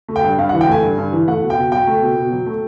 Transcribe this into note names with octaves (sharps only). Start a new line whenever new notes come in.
A3
G5
G2
G2 F5
F#5
E3
G5
A3 G#5
G2
G2
E3
A3 F#5
B2
G5
B2
F#3 G5
A3
B2
B2
F#3
A3